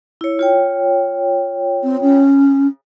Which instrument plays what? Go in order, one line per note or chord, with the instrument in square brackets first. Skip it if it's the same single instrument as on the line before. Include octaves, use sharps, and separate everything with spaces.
[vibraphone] E4 C#5
F4 C#5 G5
[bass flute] C4
C#4